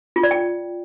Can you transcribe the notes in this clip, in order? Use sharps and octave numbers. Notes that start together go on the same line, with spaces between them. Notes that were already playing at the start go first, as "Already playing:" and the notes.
F4
D5
G5